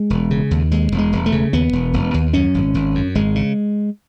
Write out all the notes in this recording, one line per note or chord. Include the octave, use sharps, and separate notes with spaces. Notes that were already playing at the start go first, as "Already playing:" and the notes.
Already playing: G#3
E1
C#3
D#2
D#2 G#3
E1
G#3
E1
A3
C#3
D#2 B3
E1
E1
D#2
F#2 C#4
G#1
G#1
F#2
G#1 G#3
C#3